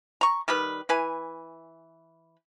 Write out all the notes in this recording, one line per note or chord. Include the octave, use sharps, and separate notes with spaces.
A#5 C#6
D#3 G3 G4 B4
E3 B4 G#5